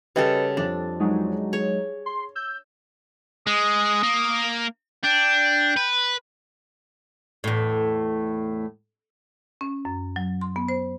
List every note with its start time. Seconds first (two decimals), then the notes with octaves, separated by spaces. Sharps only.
0.16 C#3 G3 A4 B4 D#5 G5
0.57 F2 F3 D4 A6
1.00 F#3 G#3 D#4
1.53 G#4 C#5
2.06 C6
2.35 E6 G6
3.47 G#3 D#6
4.03 A#3
5.04 D4 G5
5.77 B4
7.44 E2 A2
9.61 C#4
9.85 F#2
10.16 F#3
10.41 C6
10.56 B3
10.68 C5